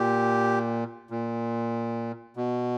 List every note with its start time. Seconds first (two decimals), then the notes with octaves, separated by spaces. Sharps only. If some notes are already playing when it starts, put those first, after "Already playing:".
Already playing: A#2 G4
1.10 A#2
2.36 B2